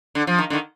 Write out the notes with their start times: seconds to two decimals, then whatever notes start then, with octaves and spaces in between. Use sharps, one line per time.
0.15 D3
0.27 F3
0.39 D#3
0.50 D3
0.53 D#3